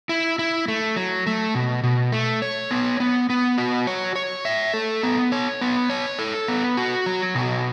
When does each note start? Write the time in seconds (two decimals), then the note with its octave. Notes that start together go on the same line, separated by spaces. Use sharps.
0.09 E4
0.39 E4
0.68 A3
0.96 F#3
1.26 A3
1.55 B2
1.83 B2
2.12 A3
2.42 C#5
2.71 B3
3.00 B3
3.30 B3
3.58 F#4
3.87 C#5
4.16 C#5
4.45 E5
4.73 A4
5.03 B3
5.32 C#5
5.61 B3
5.90 C#5
6.19 A4
6.48 B3
6.77 F#4
7.06 F#3
7.35 B2